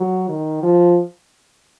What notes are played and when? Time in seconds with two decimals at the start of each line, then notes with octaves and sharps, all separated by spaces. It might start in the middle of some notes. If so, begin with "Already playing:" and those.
Already playing: F#3
0.29 D#3
0.63 F3